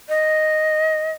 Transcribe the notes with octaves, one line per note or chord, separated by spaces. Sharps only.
D#5